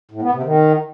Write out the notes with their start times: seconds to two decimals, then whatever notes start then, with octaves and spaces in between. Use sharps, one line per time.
0.11 A2
0.22 B3
0.32 C3
0.43 D#3